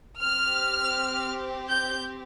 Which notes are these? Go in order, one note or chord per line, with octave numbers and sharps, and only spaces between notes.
C4 G4 F6
G6